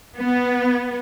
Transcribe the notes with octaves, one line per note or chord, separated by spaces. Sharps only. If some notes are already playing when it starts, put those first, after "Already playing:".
B3